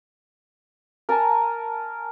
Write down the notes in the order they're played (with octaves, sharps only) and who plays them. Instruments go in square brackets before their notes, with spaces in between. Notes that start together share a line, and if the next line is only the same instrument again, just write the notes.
[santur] A#4 G#5 A5